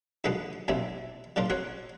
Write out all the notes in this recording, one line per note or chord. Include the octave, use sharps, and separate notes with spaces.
D#2 B2 D3 F3 G#3 B3
B1 F2 A#2 G3 C4 E4
A#2 C#3 D4 F4 A#4
C4 F#4 A#4 C#5